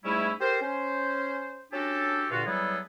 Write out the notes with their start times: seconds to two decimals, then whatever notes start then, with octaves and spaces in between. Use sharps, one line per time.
0.04 G#2 G3 A3 C#4 E4
0.41 G4 A4 A#4 C5
0.61 C#4 C5
1.72 C#4 D4 F#4 G4 A4
2.30 G2 A#2 D3 F4 F#4
2.46 E3 F#3 G3 B3 G#4 A4